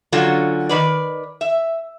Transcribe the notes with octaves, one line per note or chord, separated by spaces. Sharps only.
D3 F#3 C#4 F4 F#4
D#3 B4 D5
E5